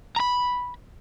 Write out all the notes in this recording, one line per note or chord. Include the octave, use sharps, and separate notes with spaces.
A#5 B5